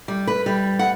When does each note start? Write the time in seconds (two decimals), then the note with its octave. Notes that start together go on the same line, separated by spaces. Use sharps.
0.08 G3
0.27 B4
0.46 G3
0.79 F#5